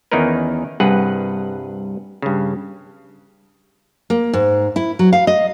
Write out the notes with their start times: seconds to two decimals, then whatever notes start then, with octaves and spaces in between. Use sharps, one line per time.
0.12 E2 D#3 C#4 D#4 A#4 B4
0.80 C2 G2 G#4 B4 F#5
2.22 G2 C#3
4.10 A#3
4.33 G#2
4.76 E4
4.99 F#3
5.13 F5
5.27 D#5